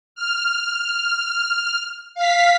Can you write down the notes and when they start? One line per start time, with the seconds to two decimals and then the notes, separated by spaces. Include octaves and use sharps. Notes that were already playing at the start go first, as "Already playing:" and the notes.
0.15 F6
2.15 F5 B6